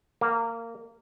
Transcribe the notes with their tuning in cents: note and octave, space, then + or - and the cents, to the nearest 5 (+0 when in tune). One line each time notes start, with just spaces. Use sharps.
A#3 -20